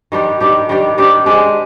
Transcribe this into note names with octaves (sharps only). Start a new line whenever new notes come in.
D#3 G3 D4 G4
D#3 G3 D4 G4
D#3 G3 D4 G4
D#3 G3 D4 G4
G#3 D4 G4